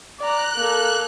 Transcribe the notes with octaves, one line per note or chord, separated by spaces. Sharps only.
D5 A#5 F#6
A#3 A4